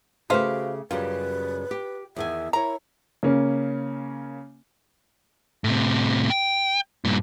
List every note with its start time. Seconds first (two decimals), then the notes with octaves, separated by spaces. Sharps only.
0.30 C#3 A3 F#4 G4 B4 C5 F5
0.91 F#2 C#3 G3 F4 B4
1.71 G4
2.16 E2 D#3 E5 G#5
2.53 E4 A#4 C#5 A#5
3.23 C#3 A#3 C#4
5.64 A2 C3
6.30 G5
7.05 G2 A#2